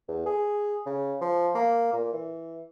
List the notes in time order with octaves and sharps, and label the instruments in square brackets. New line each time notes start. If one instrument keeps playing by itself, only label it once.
[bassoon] E2
G#4
C#3
F3
A#3
A#2
E3